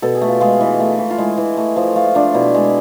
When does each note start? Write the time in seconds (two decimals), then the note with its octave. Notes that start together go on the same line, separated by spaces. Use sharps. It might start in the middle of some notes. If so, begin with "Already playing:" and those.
0.02 B2 A4
0.15 G#4
0.21 A3
0.28 F4
0.40 G#3 F4
0.60 E3
0.80 A3
0.98 E3
1.11 F4
1.18 G#3 E4
1.38 E3
1.57 A3
1.76 F3
1.95 A3 F4
2.15 F3 D4
2.34 B2 E4
2.54 G#3